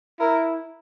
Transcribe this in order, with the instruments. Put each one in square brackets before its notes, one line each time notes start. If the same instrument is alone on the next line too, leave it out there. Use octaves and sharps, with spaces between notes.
[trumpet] E4 [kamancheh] A#4